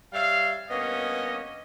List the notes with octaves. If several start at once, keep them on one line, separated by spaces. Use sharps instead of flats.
G3 C#5 E5 F5
G2 A#3 B3 C#4 D#5